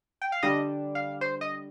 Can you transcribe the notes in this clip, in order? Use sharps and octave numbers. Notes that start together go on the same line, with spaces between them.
G5
F5
D3 G3 D4 D#5
F5
C5
D#5